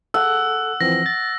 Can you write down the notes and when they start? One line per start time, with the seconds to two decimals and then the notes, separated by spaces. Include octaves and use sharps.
0.14 A4 F#5 E6
0.81 E3 F3 C4 A#6
1.06 A6